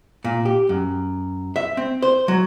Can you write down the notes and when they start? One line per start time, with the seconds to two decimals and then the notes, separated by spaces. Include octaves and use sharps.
0.24 A#2
0.45 G4
0.69 F#2
1.56 E5
1.77 C4
2.02 C5
2.28 F#3